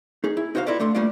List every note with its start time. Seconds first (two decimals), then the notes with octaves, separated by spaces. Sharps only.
0.24 D#4 G#4
0.37 E4
0.55 D#4 F#4 C5 C#5 F5
0.66 E4 F4 A4 B4 D5 D#5
0.80 A3 D4 A4 C6
0.95 G3 A3 A#3 D4 F4 D5